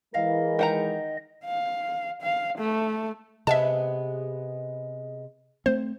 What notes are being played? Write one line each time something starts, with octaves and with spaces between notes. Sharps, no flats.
E3 G#3 A#4 D#5 F5
D#3 F#5 G5 A#5
F5
F5
A3
C3 G#3 B3 E5 A5
A3 C4 C5